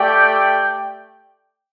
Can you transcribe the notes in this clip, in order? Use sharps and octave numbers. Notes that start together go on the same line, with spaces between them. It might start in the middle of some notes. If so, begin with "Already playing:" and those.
Already playing: A3 G4 D5 G5